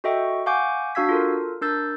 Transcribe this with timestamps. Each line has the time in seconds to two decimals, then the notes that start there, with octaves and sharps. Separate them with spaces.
0.04 F#4 A4 D#5 E5 G5 C#6
0.46 F5 F#5 G#5 C#6 D6 G6
0.95 D4 F#4 F5 E6 G#6 B6
1.09 F4 A4 A#4
1.62 D4 A#4 E6 G6 A6